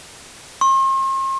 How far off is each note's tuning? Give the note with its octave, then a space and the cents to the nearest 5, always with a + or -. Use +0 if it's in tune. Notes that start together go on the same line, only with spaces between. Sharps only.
C6 +45